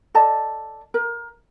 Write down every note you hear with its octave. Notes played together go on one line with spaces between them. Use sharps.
A4 D5 D#5 A5
A#4